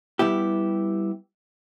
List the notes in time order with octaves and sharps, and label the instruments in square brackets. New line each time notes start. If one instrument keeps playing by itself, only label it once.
[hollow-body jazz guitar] G3 B3 E4 G4